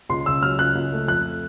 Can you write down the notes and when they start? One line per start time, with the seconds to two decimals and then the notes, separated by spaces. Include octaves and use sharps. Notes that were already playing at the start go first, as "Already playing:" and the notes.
0.09 C#2 C6
0.26 C#3 E6
0.42 F#3 F6
0.58 C#2 F#6
0.75 C#2
0.92 A3
1.08 F2 F#6